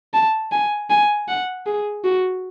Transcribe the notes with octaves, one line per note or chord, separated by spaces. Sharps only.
A5
G#5
G#5
F#5
G#4
F#4